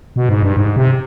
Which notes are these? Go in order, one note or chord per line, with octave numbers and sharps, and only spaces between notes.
B2
G#2
G2
G#2
C3